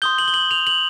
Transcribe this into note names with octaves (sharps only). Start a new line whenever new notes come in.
C6 D#6 G6 G7
F#7
G7
F#7
F7
F#7